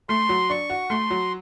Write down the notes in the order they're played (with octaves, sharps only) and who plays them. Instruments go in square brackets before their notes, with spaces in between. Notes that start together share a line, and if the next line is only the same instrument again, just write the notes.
[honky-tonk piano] A3 [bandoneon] C6
[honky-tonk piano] F#3
[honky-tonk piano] D4 [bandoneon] C#6
[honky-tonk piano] F#4
[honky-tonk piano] A3 [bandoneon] C6
[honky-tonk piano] F#3